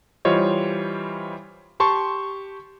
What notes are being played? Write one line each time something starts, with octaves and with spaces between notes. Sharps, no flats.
E3 G3 F4 C5 C#5 D#5
G4 A5 C6 C#6